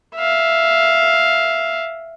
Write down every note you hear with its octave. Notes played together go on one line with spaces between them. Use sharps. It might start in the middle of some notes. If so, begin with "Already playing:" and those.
E5 F5